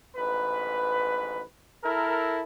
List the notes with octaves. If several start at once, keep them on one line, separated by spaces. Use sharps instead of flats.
A1 G#2 B4
E4 A4 A#4